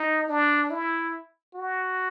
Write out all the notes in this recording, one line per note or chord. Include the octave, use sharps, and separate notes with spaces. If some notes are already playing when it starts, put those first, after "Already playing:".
Already playing: D#4
D4
E4
F#4